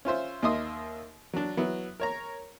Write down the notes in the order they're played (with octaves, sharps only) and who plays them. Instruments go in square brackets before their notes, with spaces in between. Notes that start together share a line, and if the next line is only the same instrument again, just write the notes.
[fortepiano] C#4 F4 C5 E5
D#2 A#3 D#5 E5 C6 D#6
F#3 D4
F#3 B3 E4
A#4 C#5 A#5